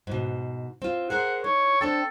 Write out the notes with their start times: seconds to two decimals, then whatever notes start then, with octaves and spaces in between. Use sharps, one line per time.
0.07 G#2 B2
0.82 C4 F4
1.10 G#4 A#4 C5 F#5
1.44 D#4 C#5
1.81 C4 D4 A4 G5